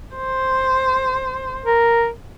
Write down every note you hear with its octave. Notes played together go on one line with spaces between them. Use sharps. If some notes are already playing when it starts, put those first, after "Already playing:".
C5
A#4